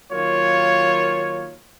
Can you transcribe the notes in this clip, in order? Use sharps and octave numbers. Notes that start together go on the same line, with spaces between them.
D#3 F#3 A#3 F4 C#5